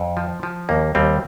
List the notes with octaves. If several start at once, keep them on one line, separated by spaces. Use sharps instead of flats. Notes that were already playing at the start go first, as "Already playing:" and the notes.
Already playing: F2
F3
F3
D#2 A#3
D#2 G3 C4